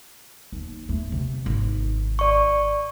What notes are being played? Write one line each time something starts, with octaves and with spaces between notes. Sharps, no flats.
D#2
A3
C3
G#1
D5 C#6